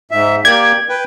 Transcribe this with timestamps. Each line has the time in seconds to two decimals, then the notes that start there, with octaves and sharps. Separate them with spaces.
0.11 G#2 E5
0.45 A#3 G4 D5 G#6
0.89 B4 G5